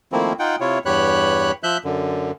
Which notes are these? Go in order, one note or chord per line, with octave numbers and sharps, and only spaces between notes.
D#3 F3 A3 A#3 C4 E4
D#4 F4 F#5 G5
C3 E4 F4 C#5
E2 G2 G4 C#5 B5 F#6
F3 E5 F#6 G6
F#2 D3